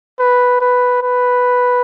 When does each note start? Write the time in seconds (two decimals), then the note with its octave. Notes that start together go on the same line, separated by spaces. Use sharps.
0.20 B4
0.61 B4
1.03 B4